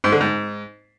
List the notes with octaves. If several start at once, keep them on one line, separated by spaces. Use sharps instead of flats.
G#2
D3
G#2